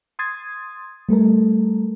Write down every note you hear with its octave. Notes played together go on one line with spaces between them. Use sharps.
C6 D#6 G#6 A6
G3 A3 A4 A#4